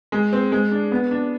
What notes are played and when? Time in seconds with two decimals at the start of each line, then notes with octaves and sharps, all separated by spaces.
0.12 G#3
0.33 C4
0.52 G#3
0.72 D4
0.92 B3
1.11 D4